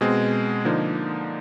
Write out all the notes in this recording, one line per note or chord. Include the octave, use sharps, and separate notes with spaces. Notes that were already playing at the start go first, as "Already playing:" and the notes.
B2 G#3 C4
D3 F3 A#3 D#4